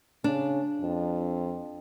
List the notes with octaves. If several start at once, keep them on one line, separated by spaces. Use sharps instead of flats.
C#3 D4
F2